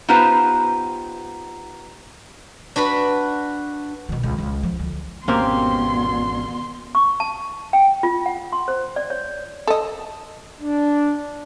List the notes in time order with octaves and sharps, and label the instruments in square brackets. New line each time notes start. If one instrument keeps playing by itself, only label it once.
[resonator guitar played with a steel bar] B3 D#4 F4 G4 B4 C5
[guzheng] D4 F#4 B4 B5
[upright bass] B2 D#3
C#2
C#2
F3
D2
[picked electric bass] G#1 E2 C#4 [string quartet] B2 [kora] A#3 C4 G4 [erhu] C6
[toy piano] C#6
A5
G5
F4
F#5
C6
C5
D5
C#5
[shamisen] A4 D#5
[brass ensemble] D4